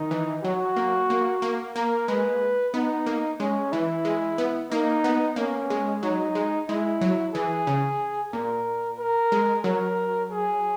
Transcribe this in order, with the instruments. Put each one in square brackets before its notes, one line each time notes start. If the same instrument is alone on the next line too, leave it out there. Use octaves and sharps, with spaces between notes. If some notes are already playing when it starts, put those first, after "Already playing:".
Already playing: [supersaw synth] D#3 [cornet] D#4
[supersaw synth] E3
[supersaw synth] F#3 [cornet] F#4
[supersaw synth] A#3
A#3
A#3
[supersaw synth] A#3 [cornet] A#4
[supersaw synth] G#3 [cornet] B4
[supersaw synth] B3 [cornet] D#4
[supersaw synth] A#3
[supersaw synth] G#3 [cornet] C#4
[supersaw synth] E3 [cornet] E4
[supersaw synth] G#3
B3
[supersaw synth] A#3 [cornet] D#4
[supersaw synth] B3
[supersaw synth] A#3 [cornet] C#4
[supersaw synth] G#3
[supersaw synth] F#3 [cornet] D#4
[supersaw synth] G#3
[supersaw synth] G#3 [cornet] E4
[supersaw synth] F#3
[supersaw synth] E3 [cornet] G#4
[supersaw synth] C#3
[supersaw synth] A#2 [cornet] A#4
[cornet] A#4
[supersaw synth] G#3
[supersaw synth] F#3 [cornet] A#4
[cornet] G#4